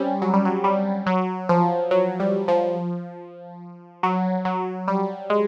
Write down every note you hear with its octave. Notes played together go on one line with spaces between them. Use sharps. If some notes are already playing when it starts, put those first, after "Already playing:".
Already playing: G3 C4 C#4
F#3
G3
F#3
G3
F#3
F3
F#3
G3
F3
F#3
F#3
G3
G#3